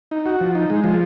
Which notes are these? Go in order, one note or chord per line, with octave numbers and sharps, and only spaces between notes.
D#4
F#4
F3
D#4
G#3
F3